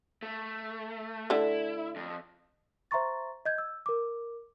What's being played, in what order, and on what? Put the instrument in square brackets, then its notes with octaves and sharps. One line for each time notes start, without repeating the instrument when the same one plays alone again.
[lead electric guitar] A3
[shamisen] D3 A3 [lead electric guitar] E4
[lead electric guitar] F2
[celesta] C5 E5 A#5 C6 C#6 A6
D#5 G6 G#6
E6
A#4 D6